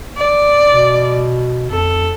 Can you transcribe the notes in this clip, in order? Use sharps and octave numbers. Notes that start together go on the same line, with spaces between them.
D5
B2
F2 A4